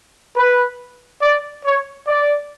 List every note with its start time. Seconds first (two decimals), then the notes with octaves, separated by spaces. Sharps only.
0.36 B4
1.22 D5
1.65 C#5
2.07 D5